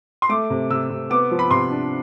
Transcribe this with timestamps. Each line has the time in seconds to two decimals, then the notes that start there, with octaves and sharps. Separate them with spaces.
0.22 C6
0.29 A3 D6
0.50 C3
0.70 C3 E6
0.90 C3
1.10 B3 D6
1.31 F3
1.39 B5
1.51 C3 C6
1.71 D4